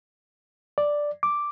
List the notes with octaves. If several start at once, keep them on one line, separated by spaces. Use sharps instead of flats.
D5
D6